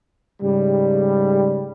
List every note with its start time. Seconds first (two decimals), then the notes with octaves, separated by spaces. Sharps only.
0.42 G#2 C#3 G3